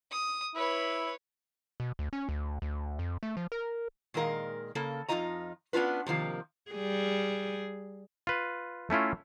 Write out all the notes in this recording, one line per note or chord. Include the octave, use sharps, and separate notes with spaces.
D#6
E4 B4 C#5
B2
D2
C#4
D2
D2
F2
A3
F3
A#4
A#2 D#3 G#3 A#4 D#5 F5
C#3 A#3 A4
F2 B2 D#4 F4 D#5 A#5
B3 C#4 D4 F4 B4
C3 D#3 F3 A#3
G3 G#4
F4 B4
A3 C#4 E4 F4